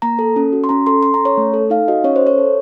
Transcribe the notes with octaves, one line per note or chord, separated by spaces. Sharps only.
A#3 A#5
A4
C#4
F#4
C6
C#4 A#5
A4 C6
A4 C6
A#5
C#4
C#5
A3
A4
D#4 F5
F#4 D#5
C#4 C#5
C5
A4
C#5
A4